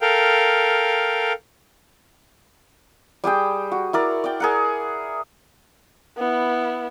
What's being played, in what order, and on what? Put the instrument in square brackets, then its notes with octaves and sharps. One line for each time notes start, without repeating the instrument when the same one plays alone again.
[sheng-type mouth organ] A4 A#4 F5 G5
[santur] G3 G4 G#4 G5
F#4
E4 A#4 D5
D5 G5
G#4 A#4 F#5
[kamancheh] B3 E4